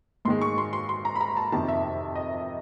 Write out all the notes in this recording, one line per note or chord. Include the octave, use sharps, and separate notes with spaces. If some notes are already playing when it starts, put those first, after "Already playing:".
G#2 D#3 G#3 C6
C#6
C6
C6
C6
A#5
B5
A#5
A5
F2 C3 D#3 A5
E5
D#5